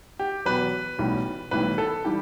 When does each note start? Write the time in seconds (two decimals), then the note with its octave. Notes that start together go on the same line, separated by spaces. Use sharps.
0.19 G4
0.46 E2 B2 F#3 B4
0.99 B1 A2 E3 G3
1.51 B1 A2 E3 G3 B4
1.78 A4
2.05 E3 G3 G4